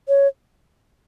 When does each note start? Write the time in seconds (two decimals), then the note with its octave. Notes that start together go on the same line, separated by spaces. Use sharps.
0.08 C#5